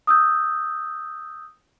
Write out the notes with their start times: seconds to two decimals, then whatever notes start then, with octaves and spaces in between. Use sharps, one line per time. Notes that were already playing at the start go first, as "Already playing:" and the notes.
0.07 D#6 E6 G6